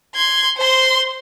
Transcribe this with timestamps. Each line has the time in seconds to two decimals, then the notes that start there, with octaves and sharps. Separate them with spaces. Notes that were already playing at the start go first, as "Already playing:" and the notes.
0.15 C6 G#6
0.57 C5 C6